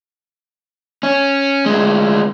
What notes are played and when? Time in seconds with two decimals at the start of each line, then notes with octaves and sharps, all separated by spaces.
1.03 C#4
1.66 D2 G#3